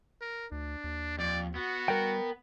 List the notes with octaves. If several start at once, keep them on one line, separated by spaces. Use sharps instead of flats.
A#4
D2 D4
D#2
F2 D5
B3 F#4
G3 A#4 G5